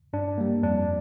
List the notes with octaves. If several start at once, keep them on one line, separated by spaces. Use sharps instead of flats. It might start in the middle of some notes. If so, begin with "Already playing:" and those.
G2 D4
G3 A#3
F2 D4